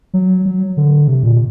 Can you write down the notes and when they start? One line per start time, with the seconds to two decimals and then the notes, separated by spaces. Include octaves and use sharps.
0.14 F#3
0.46 F#3
0.77 D3
1.08 C3
1.23 A#2